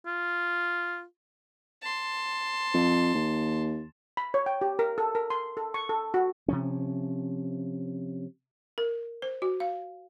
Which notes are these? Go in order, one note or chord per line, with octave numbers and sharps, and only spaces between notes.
F4
A5 C6
F2
D#2
B5
C#5
G5
G4
A#4
A4
A#4
C6
A4
C#6
A4
F#4
C3 F3 C#4
A#4
C5
F#4
F5